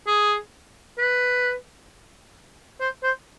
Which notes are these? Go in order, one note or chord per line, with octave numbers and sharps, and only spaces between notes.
G#4
B4
C5
C5